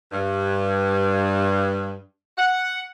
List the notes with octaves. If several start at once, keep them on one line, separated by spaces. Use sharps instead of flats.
G2
F#5